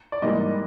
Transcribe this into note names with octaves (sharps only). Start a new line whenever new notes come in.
D5
G#2 E3 G3 A#3 D#5